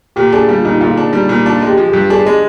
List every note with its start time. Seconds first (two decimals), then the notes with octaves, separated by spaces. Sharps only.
0.16 A#2 G4
0.33 D4 G#4
0.48 G3 F4
0.65 A#2 D#4
0.81 A#2 F4
0.97 D4
1.12 G3 D#4
1.29 A#2
1.46 D4 F4
1.62 G#3
1.67 G4
1.77 F3
1.89 G2 G4
2.10 D4 G#4
2.26 G#3